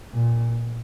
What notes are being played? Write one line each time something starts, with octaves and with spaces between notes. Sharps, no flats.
A#2